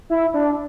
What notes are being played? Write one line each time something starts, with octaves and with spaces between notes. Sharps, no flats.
E4
D4